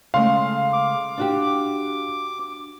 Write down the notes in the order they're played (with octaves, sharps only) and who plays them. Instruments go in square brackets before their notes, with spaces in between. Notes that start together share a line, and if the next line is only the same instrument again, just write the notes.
[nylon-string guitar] C#3 G#3 A3 [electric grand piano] F5 C6
[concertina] D6
[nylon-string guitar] D4 F#4 G4